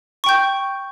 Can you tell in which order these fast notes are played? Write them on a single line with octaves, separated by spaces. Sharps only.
C#6 G5 G6